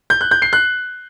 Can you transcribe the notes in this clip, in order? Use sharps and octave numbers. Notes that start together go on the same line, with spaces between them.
G6
F#6
G6
C7
F#6